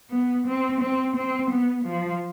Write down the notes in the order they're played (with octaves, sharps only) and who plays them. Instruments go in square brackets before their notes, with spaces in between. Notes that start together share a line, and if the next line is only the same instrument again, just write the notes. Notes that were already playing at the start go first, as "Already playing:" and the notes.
[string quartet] B3
C4
C4
C4
B3
F3